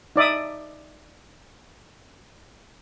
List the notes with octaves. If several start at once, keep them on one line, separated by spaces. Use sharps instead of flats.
D#4 D5 E5 D#6